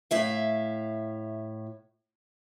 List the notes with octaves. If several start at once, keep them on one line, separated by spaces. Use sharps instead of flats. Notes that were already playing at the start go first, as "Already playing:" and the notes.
A2 E5 F5